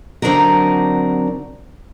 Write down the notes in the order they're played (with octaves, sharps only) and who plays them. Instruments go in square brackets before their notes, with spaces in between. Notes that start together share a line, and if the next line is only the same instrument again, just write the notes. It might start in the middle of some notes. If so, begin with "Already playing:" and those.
[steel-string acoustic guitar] D3 F#3 C4 D4 D#4 A#4